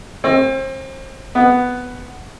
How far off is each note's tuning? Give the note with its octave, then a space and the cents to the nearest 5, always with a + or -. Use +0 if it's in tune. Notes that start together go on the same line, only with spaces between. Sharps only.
C4 +35
B3 +5